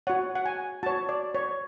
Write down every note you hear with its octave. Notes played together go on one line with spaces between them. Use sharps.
F#4 C#5 F#5
F#5
G#5
F#4 C#5 A5
D5
C#5